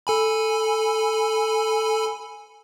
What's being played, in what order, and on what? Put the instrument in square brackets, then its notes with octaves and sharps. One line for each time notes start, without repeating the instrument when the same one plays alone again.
[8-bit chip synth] A4 G#5 B5